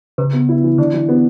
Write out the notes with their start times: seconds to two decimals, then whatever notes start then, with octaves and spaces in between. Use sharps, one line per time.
0.18 C#3 B4
0.33 B3
0.49 E4
0.64 E3
0.78 D3 D4
0.94 E3
1.09 B3